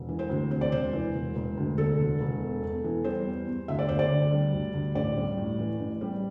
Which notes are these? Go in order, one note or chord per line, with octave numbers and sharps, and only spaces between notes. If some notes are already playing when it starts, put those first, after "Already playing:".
Already playing: E1
E3
C5
D2
C3 C5
D5
E1 C5
E3
E1
E1
D2
D3 A4
E1
E1
E2
E2
E3
G3 C5
E2
E2
D2 E5
D5
D2 C5
D5
D3
G3
D2
D2
A1 D5
G3
A2
E3
A1
G3